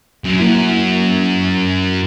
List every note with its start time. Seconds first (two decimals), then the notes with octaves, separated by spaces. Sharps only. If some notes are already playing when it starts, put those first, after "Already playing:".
0.25 F#2
0.40 A#3 E4